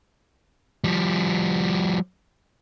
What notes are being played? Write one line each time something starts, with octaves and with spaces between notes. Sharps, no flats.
F3 G3